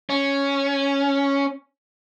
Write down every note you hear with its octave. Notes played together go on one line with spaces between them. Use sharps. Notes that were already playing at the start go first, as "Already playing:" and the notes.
C#4